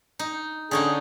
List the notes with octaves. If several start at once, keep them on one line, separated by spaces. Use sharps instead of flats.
D#4
D3 C#4 D#4 G#4